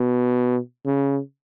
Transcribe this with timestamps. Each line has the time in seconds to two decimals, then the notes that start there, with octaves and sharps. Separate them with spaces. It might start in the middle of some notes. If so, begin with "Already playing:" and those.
Already playing: B2
0.86 C#3